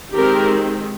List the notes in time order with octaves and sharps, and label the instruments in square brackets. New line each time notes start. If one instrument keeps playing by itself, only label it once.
[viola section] D#3 G#3 C4 G4 A#4